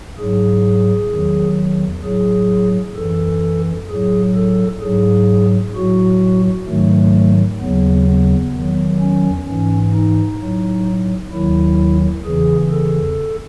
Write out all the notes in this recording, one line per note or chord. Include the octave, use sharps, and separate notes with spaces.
G#2 F#3 G#4
E2 D#3 F#3
A2 F#3 G#4
F#2 E3 A4
A2 F#3 G#4
A4
G#2 F#3 G#4
A2 F#3 F#4
G#2 D#3 F#3 A3
D#2 C#3 F#3 B3
B3
E2 D#3 F#3
C#4
G#2 E3 C#4
D#4
A2 F#3
D#2 D#3 F#3 E4
E2 C#3 E3 G#4
A4